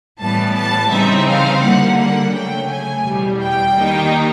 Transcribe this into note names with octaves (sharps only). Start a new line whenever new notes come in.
A2 E3 G3 B3 A5
A5
C#3 E3 G3 C4 D#4 E5
F5
D3 G3 A#3 F#5
F#5
C#3 F#3 A3 G5
G#5
E2 B2 G3
G5
D#3 G3 A#3 D#4